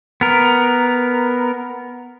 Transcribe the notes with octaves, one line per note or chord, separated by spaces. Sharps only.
B3 A#4